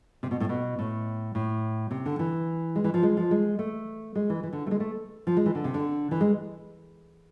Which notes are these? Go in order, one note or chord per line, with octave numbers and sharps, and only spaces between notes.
C3
B2
A2
B2
A2
A2
C3
D3
E3
G#3
E3
F3
G#3
F3
G#3
A3
G#3
E3
E3
D3
A3
G#3
A3
F3
G#3
E3
D3
C3
D3
E3
G#3